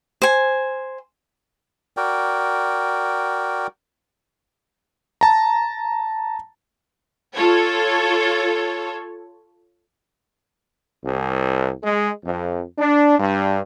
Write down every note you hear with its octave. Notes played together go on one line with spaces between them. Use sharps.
C5 G#5
F#4 A#4 D5 G5
A5 A#5
F4 A4 C#5
C2
G#3
F2
D4
G2